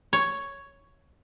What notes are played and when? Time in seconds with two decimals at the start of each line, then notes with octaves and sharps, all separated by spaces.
0.13 C#5